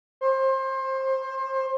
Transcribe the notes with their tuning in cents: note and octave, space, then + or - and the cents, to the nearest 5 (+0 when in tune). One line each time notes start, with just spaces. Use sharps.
C5 +25